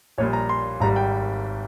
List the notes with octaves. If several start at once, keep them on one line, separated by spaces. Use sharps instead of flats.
A#1 A#2 G3 C#5
A#5
C6
G#1 G#2 G3 A#5
G5